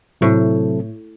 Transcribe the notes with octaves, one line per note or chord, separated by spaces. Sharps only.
A2 C3 F#3 C4 E4 A4